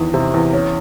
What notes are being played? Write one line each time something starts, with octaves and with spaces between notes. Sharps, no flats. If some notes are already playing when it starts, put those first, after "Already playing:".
Already playing: E2 D#3
C3
E2
C#4